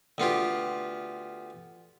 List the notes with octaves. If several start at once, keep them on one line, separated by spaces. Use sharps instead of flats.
D2 B3 F4 G4